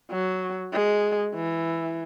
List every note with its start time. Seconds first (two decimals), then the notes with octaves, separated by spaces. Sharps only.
0.11 F#3
0.73 G#3
1.35 E3